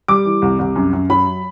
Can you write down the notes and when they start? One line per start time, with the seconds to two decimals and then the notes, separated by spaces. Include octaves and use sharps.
0.08 G3 D6
0.25 E3
0.42 C2
0.59 C2
0.75 F#2
0.93 F#2
1.10 F#3 B5